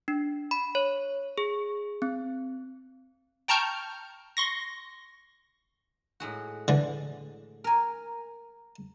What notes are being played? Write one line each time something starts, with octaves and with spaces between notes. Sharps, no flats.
D4
B5
C#5
G#4
C4
G5 A5 A#5 C#6 F6 G6
C6 C#6 A#6
A2 G#3 F#4
D3 E3
A#4 G#5